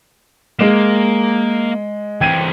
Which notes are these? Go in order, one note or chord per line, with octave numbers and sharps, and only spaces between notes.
G#3 A#3 E7
E3 C4 G5 G#6 D#7